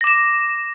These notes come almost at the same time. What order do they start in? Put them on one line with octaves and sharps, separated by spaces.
A#6 D6 E7